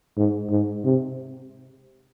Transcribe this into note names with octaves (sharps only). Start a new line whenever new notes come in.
G#2
G#2
C3